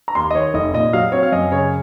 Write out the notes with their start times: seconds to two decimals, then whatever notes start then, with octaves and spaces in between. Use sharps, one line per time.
0.08 A#5
0.15 D#2 C6
0.31 D#5
0.35 D#3 C#5
0.54 F1 D#5
0.74 A#2 D#5
0.93 F#3 F5
1.12 C4 C#5
1.23 F5
1.32 F#2 D#5
1.51 C#3 C#5